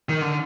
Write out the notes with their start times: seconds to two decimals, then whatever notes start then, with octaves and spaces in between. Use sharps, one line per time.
0.09 D#3
0.22 D3